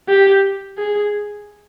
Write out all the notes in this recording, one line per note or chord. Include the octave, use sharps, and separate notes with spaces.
G4
G#4